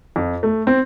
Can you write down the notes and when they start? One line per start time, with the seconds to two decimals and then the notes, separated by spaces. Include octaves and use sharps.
0.16 F2
0.43 A3
0.67 C4